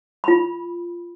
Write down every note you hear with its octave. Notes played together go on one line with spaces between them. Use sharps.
F4 B5